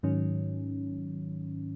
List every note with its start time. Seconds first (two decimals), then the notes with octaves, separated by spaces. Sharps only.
0.03 G#2 D#3 F#3 C#4